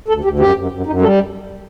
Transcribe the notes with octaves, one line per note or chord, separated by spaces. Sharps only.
D2 A4
D2 G4
F#2 G4
F#2
F#2
F#2 D#4
G3 A4